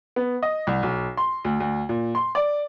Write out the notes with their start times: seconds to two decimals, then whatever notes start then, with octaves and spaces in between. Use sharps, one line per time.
0.16 B3
0.43 D#5
0.67 C2
0.83 B1
1.17 C6
1.45 D2
1.60 D2
1.89 A#2
2.15 C6
2.35 D5